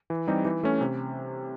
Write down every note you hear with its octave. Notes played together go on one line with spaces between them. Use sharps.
E3
G3 C4 D#4 G4
E3
A3 C#4
C3